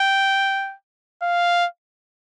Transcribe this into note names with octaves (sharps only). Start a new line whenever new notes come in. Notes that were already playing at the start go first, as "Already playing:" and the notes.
Already playing: G5
F5